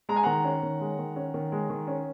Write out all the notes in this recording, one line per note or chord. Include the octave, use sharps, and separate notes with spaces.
G#3 A#5
G#5
D#3 F#5 A#5
C#4
D#3
G#3
D#3
C#4
D#3
G#3
D#3
C#4